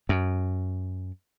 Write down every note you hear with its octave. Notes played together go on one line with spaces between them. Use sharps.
F#2